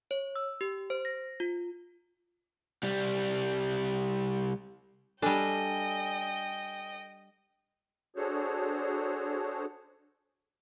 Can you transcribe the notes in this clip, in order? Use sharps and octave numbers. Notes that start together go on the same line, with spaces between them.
C#5
E6
G4
C5
A#6
F4
C2 G3
G3 D4 A4 D#5 G5 G#5
D4 F#4 G#4 A4 C5 C#5